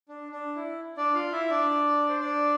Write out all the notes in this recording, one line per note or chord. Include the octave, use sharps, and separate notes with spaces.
D4
D4
E4
D4 D5
F4 F5
E4 E5
D4 D5
C5
D4 D5